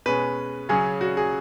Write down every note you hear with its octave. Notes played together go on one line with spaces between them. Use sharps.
B2 G#3 C#4 B4
C#3 F#3 C#4 G#4
F#4
G#4